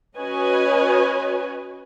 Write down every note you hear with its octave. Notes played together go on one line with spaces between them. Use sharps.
C#4 F#4 B4 C#5 D#5 G#5